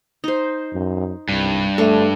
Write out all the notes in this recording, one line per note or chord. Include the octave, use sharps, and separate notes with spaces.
D#4 C5
F#2
C2 G2
A3 D4 A4